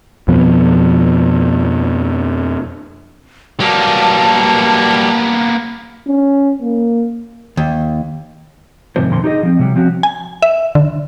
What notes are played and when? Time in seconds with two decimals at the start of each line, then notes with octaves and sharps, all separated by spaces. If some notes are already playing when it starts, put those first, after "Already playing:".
0.28 F2 B2 F3 B3
3.60 F#3 G3 A#3 B3 A5
6.08 C#4
6.62 A#3
7.57 D#2
8.96 D#2 G#2 C3 F3 C5
9.09 F2 A#2 D3 A#5 C6
9.24 D#4 G4 G#4 D#5
9.43 F3 C4
9.59 C3 F#3 G3
9.76 F3 C4 C#4 F#4
10.03 G#5
10.42 E5
10.75 D3